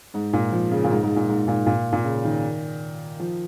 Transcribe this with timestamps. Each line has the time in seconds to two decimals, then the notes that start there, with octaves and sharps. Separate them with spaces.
0.14 G#2
0.33 A#2
0.52 F3
0.71 C#3
0.84 A#2
0.91 G#2
1.03 G#2
1.16 A#2
1.28 G#2
1.48 A#2
1.66 A#2
1.92 A#2
2.04 C#3
2.24 D#3
3.20 F3